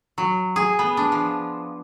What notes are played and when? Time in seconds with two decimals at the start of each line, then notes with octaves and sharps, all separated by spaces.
0.18 F#3
0.56 G#4
0.79 B3
0.97 D4
1.12 F3